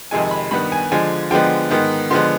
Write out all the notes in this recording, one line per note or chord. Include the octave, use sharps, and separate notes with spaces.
F2 C3 D#3 G#3 G#5
B5
G2 D#3 B3 B5
G#5
D3 F3 G#3 G#5
D3 F3 G#3 B3 G5
G#2 D#3 B3
D3 F3 G#3 B3 C6